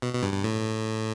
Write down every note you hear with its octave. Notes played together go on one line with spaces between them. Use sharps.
B2
B2
G2
G2
A2